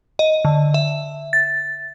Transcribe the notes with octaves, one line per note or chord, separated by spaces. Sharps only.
D#5
D3
E5
A6